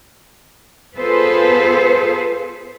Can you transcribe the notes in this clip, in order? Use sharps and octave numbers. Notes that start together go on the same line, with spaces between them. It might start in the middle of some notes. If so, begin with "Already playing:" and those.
B3 F4 G#4 A4 B4 C5